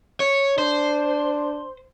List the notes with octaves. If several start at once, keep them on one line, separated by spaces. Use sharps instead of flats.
C#5
D4 C5